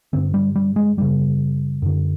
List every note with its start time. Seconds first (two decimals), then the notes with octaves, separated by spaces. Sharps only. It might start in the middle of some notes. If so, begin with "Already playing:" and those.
0.13 G2 D3 C4
0.34 G3
0.55 G3
0.76 G#3
0.97 F#2 C#3 G3
1.82 F#2 D3